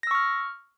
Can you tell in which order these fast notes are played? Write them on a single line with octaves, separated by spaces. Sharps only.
A#6 E6 C#6 F6